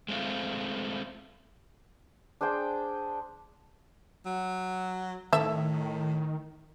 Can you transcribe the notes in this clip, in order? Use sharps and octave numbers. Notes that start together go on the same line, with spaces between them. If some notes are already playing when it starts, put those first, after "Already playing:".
G#3 A3 C4 F4
D4 G#4 C5 G5
F#3
A2 D#3 A4 E5